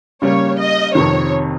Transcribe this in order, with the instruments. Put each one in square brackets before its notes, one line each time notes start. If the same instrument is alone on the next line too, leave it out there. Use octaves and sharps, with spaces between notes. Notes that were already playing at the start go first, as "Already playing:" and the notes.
[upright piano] C#3 G3 A#3 [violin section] C#5
[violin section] D#5
[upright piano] F2 C3 D#3 [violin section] C#5